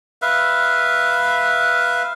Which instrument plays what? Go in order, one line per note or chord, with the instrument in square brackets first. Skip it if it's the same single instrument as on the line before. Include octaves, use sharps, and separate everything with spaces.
[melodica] B4 E5 F5